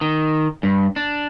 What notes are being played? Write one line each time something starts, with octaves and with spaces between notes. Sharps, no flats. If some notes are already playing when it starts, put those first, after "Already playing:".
D#3
G2
D4